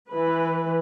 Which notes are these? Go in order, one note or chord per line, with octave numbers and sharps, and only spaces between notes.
E3 B4